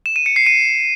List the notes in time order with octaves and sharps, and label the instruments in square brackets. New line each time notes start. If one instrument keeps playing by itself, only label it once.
[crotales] E7
D#7
C#7
C7
D#7